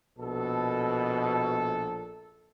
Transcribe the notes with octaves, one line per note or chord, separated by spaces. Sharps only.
A#1 B2 A4